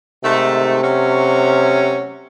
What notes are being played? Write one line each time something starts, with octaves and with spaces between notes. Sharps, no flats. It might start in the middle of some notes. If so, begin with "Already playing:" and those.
G#2 C3 D#3 A3
F#3 A3 C#4